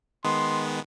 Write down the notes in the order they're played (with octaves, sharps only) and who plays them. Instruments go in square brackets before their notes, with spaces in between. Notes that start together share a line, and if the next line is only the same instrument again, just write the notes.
[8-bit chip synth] D#3 G#3 B3 [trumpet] C6